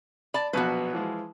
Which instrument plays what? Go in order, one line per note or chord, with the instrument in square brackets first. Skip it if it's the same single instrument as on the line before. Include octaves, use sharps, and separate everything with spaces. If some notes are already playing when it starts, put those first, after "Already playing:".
[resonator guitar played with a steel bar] D5 A5 [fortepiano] B5
[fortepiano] A#1 B2 F#3 [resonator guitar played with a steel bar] F#4 B4
[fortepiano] E3 F3 G#3